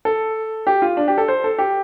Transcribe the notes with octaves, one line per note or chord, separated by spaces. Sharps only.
A4
G4
F4
D4
G4
A4
C5
A4
G4